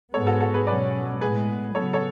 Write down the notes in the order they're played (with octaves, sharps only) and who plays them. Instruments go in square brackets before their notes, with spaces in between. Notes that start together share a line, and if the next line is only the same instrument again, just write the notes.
[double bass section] G#2 G#3 B3 [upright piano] A4 C#5
[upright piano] F#4 A4
F#4 A4
G#4 B4
[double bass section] B2 F#3 C#4 [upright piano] B4 D5
[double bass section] A2 G#3 B3 [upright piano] G#4 B4
[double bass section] C#3 F#3 B3 [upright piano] A4 C#5
[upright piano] A4 C#5